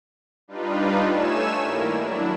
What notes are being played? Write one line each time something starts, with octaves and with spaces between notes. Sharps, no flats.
G3 D4 D#4 F4 B4
A3 C#5 G#5 E6 E7
G2 D#3 G3 A#3 E4 A#4
F#3 D4 E4